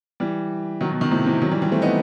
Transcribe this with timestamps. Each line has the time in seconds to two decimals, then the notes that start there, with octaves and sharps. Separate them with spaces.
0.20 E3 G3
0.81 D#3 F#3
0.91 B2
1.01 B2 D#3
1.11 A2 C3
1.26 C3 E3
1.42 D#3 F#3
1.51 E3 G3
1.62 E3 G3
1.72 A3 C4
1.82 B3 D#4